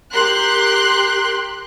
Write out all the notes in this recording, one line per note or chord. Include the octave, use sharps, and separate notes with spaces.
G4 A#4 C6 F#6